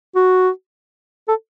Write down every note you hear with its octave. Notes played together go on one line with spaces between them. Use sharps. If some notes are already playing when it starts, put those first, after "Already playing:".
F#4
A4